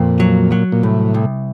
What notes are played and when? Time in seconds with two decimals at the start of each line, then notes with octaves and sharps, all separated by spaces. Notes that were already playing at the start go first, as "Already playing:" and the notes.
Already playing: F2 A#2
0.20 F#3
0.52 F#3
0.72 A#2
0.83 C2 A2
1.14 C2